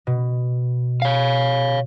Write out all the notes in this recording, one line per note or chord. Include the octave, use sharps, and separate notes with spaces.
B2
C#5 F5